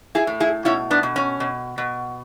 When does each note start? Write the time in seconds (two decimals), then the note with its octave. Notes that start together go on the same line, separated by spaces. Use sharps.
0.15 E4 G#4
0.27 A2
0.40 E4 G#4
0.65 B2 C#4 E4
0.91 B3 D4
1.03 B2
1.16 C#4
1.40 B2
1.78 B2